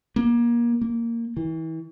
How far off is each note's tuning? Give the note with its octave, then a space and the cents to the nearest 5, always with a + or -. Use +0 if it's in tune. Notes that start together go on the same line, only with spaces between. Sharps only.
A#3 +25
A#3 -10
E3 -35